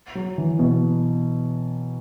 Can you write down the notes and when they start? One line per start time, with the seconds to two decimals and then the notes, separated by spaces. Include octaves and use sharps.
0.15 F#3
0.38 E3
0.59 B2